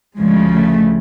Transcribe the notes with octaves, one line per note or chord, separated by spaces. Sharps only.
D2 C#3 F3 G#3
A3